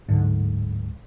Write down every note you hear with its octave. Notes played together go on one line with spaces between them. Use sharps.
D1 G#2 D3